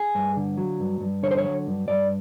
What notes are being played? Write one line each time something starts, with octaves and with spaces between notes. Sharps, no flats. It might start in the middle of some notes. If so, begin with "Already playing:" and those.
Already playing: G#4
G2
D3
F#3
G2
G2
D3 C#5
C5
C#5
F#3
G2
G2 D5